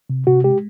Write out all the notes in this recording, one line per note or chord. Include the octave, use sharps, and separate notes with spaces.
C3
C3 F#4
G#3 G4